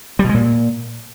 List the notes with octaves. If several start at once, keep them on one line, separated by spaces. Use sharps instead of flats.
G3
B2
G#3
A#2